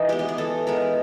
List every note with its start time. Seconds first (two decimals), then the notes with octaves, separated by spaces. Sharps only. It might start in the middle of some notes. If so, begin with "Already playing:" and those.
Already playing: E3 D#4
0.09 G#3 B3 G4
0.19 G4
0.29 G#4
0.38 E3 A4
0.67 G#3 B3 A#4